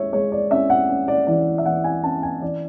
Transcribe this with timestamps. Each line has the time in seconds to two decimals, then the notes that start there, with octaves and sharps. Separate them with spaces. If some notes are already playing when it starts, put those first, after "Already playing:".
Already playing: G#3 C#4 C#5 E5
0.13 G#3 C#5
0.32 D5
0.51 C#4 E5
0.70 F#5
0.89 C#4
1.08 D5
1.27 E3 D5
1.58 E5
1.66 E3 F#5
1.84 G#5
2.03 C#4 A5
2.23 G#5
2.42 E3 D5